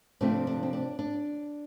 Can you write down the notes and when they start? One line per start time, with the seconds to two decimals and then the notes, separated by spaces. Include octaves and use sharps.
0.21 C3 F3 A3 C4 D4
0.47 D4
0.63 C4
0.73 D4
0.99 D4